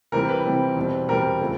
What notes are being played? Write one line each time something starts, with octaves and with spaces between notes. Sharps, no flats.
C3 E3 G3 C4 A#4
B4
C3 E3 G3 C4
E2 B2 G3 C4
E2 B2 G3 C4 A#4
C#3 F3 A3